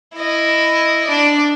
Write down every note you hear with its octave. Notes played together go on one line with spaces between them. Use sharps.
E4 D#5
D4 D5